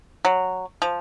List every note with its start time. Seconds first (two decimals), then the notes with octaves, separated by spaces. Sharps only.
0.25 F#3
0.82 F3